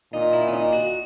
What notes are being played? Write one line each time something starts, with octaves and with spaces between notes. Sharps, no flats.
A#2 D#4
E4
C#4
D#4
F#4